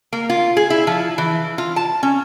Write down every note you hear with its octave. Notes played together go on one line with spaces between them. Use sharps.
A#3
F4
G#4
E4
F3
E3
F4
A5
C#4